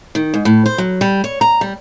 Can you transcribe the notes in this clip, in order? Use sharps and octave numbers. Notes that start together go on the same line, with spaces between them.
D#3
G#2
A2
C5
F#3
G3
C#5
A#5
G3